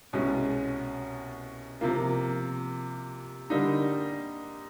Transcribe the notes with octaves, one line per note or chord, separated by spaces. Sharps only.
C2 B2 G#3 C#4
C3 F3 A#3
D3 G3 A#3 D#4